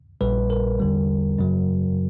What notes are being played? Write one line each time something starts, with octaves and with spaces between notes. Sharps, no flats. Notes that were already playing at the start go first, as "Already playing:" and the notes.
A#1 A#2 G3 B4
A#4
E2 D3 G3
F#2 C#3 F#3